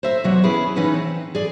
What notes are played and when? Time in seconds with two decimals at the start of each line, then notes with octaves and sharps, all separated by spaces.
0.03 C5 E5 A#5
0.24 E2 C3 F#3 D#5 F#5
0.43 B3 C#4 E4 G#4 B4
0.76 E3 C#4 D#4 B4 F#5 G#5
0.94 C4
1.35 G#4 D5